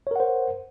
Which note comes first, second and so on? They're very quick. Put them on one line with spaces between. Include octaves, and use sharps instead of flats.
C#5 A#4 F#5 C5